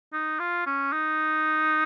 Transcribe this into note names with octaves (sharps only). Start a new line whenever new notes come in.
D#4
F4
C#4
D#4